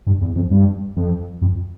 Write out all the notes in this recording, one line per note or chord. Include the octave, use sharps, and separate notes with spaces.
G2
E2
F2
G2
F2
F2